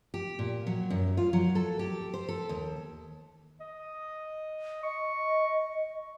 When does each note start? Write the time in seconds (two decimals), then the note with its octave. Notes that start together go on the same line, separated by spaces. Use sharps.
0.14 G4
0.39 A#2
0.67 F#3
0.90 F#2
1.17 F4
1.33 F#3
1.55 A4
1.79 G4
2.14 C5
2.29 A4
2.49 D#2
3.60 D#5
4.83 D#5 C#6